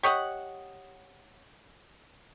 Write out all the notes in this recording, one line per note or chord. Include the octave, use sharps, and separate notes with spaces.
G4 C#5 D#5 F#5